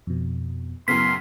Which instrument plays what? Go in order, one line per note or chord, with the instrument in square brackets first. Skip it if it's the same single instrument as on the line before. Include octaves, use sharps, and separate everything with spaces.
[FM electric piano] F2 B2
[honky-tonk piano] F#2 A2 C#3 [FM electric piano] B3 [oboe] C6 [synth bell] B6